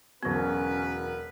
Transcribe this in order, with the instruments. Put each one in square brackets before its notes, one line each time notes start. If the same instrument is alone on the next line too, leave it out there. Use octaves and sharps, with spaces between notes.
[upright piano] E1 F#3 [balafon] D3 B3 [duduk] C#4 [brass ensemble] A#4 B4